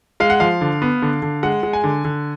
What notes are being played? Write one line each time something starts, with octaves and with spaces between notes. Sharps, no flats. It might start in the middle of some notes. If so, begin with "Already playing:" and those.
G#3 F5
F#5
F3 F5
D3
B3
D3
D3
G#3 F#5
G#3
G#5
D3
D3